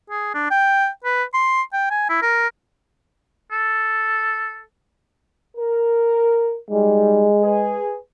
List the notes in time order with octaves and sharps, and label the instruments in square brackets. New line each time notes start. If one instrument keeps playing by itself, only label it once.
[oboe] G#4
D4
G5
B4
C6
G5
G#5
E4
A#4
A4
[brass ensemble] A#4
[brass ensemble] G3 D#4 [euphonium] G#3
[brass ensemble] G#4 B4